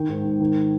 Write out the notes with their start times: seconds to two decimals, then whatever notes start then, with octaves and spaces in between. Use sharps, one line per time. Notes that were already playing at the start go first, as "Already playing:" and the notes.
Already playing: D#3 G5
0.09 G#2
0.25 G#2
0.40 D#3